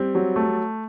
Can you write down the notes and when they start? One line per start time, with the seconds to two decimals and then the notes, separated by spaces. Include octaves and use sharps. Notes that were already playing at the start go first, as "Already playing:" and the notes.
Already playing: G3 C4
0.15 F#3
0.36 A3